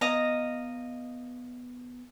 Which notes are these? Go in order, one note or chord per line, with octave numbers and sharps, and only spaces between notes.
B3 D#5 F5 A#5